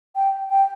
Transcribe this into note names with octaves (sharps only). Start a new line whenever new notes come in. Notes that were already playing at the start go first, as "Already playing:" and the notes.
G5
G5